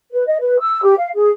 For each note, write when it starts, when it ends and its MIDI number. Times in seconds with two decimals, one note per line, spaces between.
0.11 0.25 71
0.26 0.36 75
0.39 0.59 71
0.59 0.81 88
0.84 0.95 67
0.98 1.09 77
1.15 1.29 68